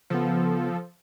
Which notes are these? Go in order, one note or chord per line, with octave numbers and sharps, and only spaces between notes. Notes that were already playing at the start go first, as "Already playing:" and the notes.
C#3 F3 B3 A4